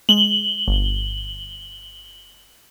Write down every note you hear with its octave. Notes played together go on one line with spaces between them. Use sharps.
G#3 F#7 G7
G1